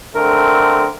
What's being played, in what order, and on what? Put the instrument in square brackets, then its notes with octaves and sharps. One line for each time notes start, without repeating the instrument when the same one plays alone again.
[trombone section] D3 A3 C4 [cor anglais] A#4